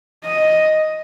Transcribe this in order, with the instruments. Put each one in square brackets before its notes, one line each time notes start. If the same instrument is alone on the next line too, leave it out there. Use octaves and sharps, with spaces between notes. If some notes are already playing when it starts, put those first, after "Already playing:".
[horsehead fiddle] D#5